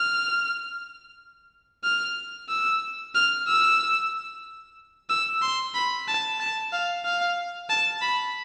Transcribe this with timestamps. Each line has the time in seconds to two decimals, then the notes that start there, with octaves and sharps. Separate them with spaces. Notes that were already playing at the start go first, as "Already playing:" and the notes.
Already playing: F6
1.84 F6
2.49 E6
3.14 F6
3.48 E6
5.09 E6
5.42 C6
5.74 B5
6.08 A5
6.40 A5
6.72 F5
7.05 F5
7.69 A5
8.02 B5